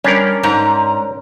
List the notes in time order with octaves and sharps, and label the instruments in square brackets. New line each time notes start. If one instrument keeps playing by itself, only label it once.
[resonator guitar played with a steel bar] G3 [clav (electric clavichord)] C#4 D4 A#4
[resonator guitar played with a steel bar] G#2 A#5